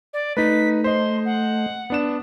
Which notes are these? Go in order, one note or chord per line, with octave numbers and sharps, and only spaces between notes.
D5
A3 D#4 B4 B6
C5 D#5 C6
F#5
B3 D4 E7